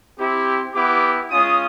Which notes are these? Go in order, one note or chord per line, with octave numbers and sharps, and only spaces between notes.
C4 E4 G4
B3 E4 G4 D6
G#3 C#4 F4 D#6